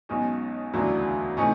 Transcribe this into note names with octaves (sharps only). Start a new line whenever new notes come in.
B1 B2 G#3 C#4 D#4
E1 D2 C#3 F#3 D4 E4
C3 E3 A3 C#4 D#4